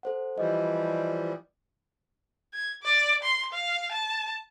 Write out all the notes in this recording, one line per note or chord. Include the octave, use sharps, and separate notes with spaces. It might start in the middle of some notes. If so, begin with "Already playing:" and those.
A4 C5 F#5
E3 F3 G3 D#5
G#6
D5
C6
F5
A5